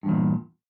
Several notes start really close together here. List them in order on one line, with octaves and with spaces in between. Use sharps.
G2 E2 A#2